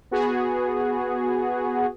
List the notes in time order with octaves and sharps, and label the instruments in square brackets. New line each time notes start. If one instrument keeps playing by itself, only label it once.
[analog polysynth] B3 F#4 G#4